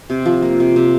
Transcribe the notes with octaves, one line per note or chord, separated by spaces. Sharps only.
C3
F3
A#3
C3
C3